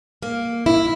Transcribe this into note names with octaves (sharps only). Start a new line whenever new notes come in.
A#3
E4